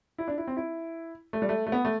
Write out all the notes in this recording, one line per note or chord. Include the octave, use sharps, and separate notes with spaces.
E4
D4
E4
C4
E4
A3
G3
A3
A3
B3
A3